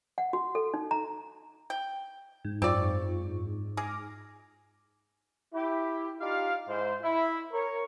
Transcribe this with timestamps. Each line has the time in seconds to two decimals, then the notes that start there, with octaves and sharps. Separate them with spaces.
0.18 F#5
0.33 F#4
0.55 A4
0.74 D#4
0.91 A#5
1.70 G5
2.45 G#2
2.62 F#2 C4 F4 D5 C#6
3.77 G#4 D6 F6 A#6
5.53 E4 G4
6.21 D#4 F4 G4 D5 F5
6.68 G#2 E4 C5
7.02 E4
7.53 A#4 C#5